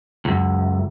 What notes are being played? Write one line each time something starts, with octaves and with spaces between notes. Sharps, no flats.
C#2 F#2